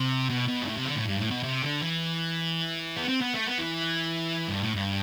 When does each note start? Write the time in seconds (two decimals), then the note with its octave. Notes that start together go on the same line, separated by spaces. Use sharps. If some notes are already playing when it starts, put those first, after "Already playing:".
Already playing: C3
0.30 B2
0.48 B2
0.63 G2
0.67 A2
0.77 C3
0.86 D3
0.96 A2
1.06 G2
1.18 A2
1.31 B2
1.43 C3
1.62 D3
1.82 E3
2.96 B3
3.08 C4
3.21 B3
3.34 A3
3.46 B3
3.59 E3
4.48 G2
4.61 A2
4.74 G2